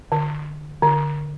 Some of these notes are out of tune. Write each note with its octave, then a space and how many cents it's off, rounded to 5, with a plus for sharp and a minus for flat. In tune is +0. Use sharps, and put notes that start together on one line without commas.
D3 +25
D3 +5